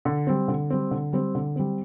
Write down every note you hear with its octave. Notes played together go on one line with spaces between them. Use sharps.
D3
G3 C4
D3
G3 C4
D3
G3 C4
D3
G3 C4